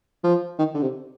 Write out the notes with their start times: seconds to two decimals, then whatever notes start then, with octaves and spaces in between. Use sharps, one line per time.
0.24 F3
0.59 D#3
0.74 D3
0.82 C3